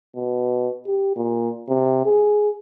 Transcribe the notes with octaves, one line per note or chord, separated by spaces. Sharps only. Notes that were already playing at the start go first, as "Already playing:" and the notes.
B2
G4
A#2
C3
G#4